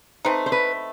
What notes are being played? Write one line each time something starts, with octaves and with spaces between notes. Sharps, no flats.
A3 C4 D#4 B4
C5
B4